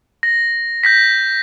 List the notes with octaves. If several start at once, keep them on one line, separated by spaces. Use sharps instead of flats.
A#6
G6 A#6 B6